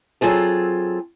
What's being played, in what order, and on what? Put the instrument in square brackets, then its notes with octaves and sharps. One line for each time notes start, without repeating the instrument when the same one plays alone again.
[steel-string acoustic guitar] F#3 C4 F4 G#4 A4